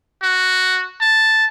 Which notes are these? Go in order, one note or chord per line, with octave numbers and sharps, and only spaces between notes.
F#4
A5